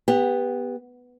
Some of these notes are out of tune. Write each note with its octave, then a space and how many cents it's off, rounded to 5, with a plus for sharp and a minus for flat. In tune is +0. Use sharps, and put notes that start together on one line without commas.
B3 -5 G4 +25